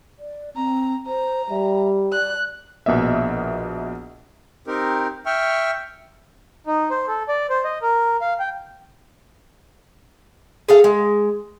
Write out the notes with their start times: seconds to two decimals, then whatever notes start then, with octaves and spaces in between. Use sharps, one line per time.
0.19 D5
0.56 C4 A#5
1.06 C5 A#5
1.50 G3 E5
2.11 D5 F#6
2.86 A#1 B2 A#3 D#5 E5
4.67 C4 D#4 G4 A#4
5.26 E5 G5 C#6 F6
6.67 D#4
6.90 C5
7.08 A4
7.29 D5
7.50 C5
7.64 D#5
7.82 A#4
8.21 F5
8.40 G5
10.69 G#4 A4 F5
10.84 G#3